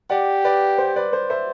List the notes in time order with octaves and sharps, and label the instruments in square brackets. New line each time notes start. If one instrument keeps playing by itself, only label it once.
[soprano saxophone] G4 [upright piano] D5 F#5
[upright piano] B4 D5
C5
B4 D5
C5
C5 E5